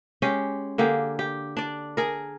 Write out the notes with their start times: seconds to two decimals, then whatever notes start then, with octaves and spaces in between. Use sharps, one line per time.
0.22 G#3 C#4 G4
0.78 D3 A#3 G4 G#4
1.19 G4
1.57 D4 D5
1.97 G#4 A#4